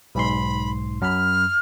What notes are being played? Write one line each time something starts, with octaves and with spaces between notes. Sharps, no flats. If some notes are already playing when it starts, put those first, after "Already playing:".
B1 G#2 B5 C6
F#2 B5 F6